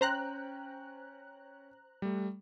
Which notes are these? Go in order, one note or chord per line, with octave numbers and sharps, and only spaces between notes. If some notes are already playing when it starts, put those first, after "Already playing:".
C#4 C5 G5 A#5 F#6
G3 A3